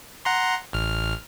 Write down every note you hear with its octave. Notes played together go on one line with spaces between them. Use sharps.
F#5 A#5 C6
A1 F6